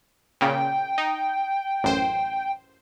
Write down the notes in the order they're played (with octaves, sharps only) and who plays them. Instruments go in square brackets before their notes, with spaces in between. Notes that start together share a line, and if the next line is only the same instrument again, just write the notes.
[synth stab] A#2 C#3 [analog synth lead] G5
[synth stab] D#4
A1 F#2 C5